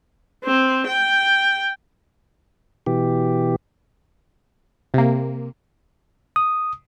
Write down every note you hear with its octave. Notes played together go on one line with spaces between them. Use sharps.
C4
G5
B2 E3 G4
C3 A#3
D#6